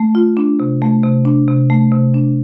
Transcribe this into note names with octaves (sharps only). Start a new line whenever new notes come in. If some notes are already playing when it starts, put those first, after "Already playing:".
Already playing: A3
F4
D4
C3
A3
C3
D4
C3
A3
C3
D4